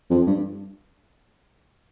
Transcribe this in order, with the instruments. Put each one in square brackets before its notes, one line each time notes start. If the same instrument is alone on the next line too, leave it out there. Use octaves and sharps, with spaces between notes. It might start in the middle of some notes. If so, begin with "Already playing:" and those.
[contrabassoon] F2
G2